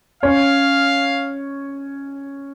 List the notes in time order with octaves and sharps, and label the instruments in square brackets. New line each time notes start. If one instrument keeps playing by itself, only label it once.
[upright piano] C#4 C#5 [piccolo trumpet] F5